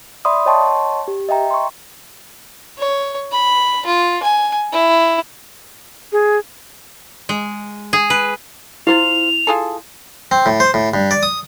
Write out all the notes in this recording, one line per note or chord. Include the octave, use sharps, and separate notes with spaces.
D5 E5 B5 C6 D#6
C#5 D#5 G5 A5 C6 C#6
G4
D#5 E5 G5 A#5
C6 C#6
C#5
B5
F4
G#5
E4
G#4
G#3
G#4
B4
E4 F4 C5 F5 F7
F4 G#4 A4
C4
A2
C5
A2
G2
D5
D#6